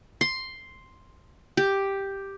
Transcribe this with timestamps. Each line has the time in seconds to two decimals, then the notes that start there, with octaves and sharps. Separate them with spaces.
0.21 C6
1.57 G4